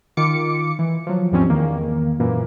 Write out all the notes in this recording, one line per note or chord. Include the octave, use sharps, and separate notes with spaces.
D#3 F4 D6 C#7
E3
F3 F#3
D#2 G#2 F3 G3 C4 C#4
E2 D#3 A#3
F#2 A#2 E3 A#3